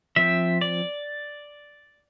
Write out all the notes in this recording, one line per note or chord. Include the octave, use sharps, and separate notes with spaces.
F3 C4 E5
D5